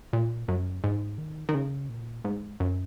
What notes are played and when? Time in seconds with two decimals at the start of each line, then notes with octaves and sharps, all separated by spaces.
0.13 A#2
0.48 F#2
0.84 G#2
1.18 D#3
1.49 D#3
1.54 C#3
1.89 A#2
2.25 G#2
2.60 F#2